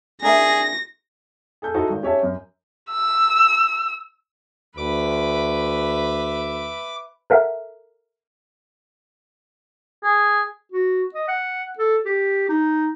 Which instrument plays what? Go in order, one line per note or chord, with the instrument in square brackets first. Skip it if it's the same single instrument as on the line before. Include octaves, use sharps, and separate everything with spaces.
[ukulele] D4 A#4 E5 [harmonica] G#4 [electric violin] A#6
[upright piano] G#4 A4 G6
D#4 E4 F#4 A4 C5
G#1
C#4 G4 C#5 E5 A5
F#2
[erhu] E6
[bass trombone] D2 [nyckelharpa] B4 E5 [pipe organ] D6
[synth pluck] A4 A#4 E5 F#5
[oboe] G#4
[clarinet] F#4
D#5
F#5
A4
G4
D#4